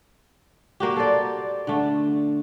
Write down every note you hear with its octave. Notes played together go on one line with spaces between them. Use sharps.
A#3 F#4 G4
A4 C5 D5
D3 A3